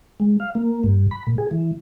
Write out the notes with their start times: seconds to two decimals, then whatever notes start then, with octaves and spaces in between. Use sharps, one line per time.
0.20 G#3
0.40 F5
0.55 A#3
0.84 G2
1.11 B5
1.27 A#2
1.38 G#4
1.51 E3